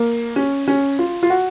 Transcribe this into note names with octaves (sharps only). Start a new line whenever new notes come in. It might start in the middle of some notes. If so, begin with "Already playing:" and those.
Already playing: A#3
C#4
C#4
F4
F4
F#4